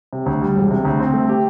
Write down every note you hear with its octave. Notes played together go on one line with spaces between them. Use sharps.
C3
D2
G3
E1
C3
D2
C4
A3
G4